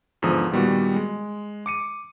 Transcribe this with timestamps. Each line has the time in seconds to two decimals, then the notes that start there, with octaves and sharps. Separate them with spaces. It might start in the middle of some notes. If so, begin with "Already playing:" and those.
0.22 E2 G#2 D3 F3 A#5 D#6
0.52 A#2 D#3 G3 B3 F#4
0.95 G#3
1.66 D6 C#7 D#7